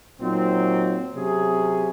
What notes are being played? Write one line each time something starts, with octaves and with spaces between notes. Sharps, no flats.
A#2 F#3 C4 D#4
C3 F#3 C#4 G#4